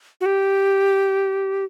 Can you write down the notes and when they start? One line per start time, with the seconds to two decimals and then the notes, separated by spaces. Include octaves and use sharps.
0.21 F#4
0.26 G4